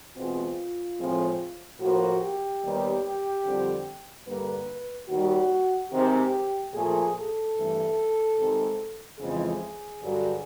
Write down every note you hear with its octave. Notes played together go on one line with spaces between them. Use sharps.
E2 B2 G#3 C4 F4
A2 F3 G#3 C4
A2 F3 A#3 F#4
G4
D#2 D#3 G3 B3
F2 D3 G3 C4
G2 D3 G3 A#3 B4
D#2 D#3 G3 F#4
C3 D#3 G#3 C4 G4
A#2 F3 A3 G#4
A4
G2 E3 A3
C3 D#3 G#3
F2 C#3 E3 G#3 G#4
G2 D3 F#3